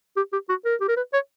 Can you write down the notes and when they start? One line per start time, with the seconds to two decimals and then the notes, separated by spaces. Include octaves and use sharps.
0.16 G4
0.33 G4
0.49 F#4
0.65 A#4
0.81 G4
0.88 A#4
0.97 B4
1.13 C#5